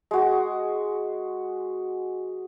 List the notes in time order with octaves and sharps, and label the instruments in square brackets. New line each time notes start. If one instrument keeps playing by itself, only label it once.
[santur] G#3 F#4